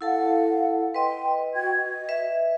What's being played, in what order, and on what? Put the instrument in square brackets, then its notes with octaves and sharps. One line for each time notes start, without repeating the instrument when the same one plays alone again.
[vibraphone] E4 A4 A5 [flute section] F5 F#5
[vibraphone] B4 D#5 [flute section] G5 C6
[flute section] F#4 G5 G#6
D#5
[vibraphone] B4 E5